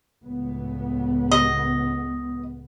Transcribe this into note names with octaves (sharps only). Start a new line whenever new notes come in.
C#2 A2 B3
D#5